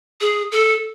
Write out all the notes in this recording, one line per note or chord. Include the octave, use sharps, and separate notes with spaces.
G#4
A4